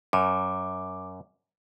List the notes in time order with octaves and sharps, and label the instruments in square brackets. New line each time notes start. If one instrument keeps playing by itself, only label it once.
[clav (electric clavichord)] F#2 [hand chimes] D6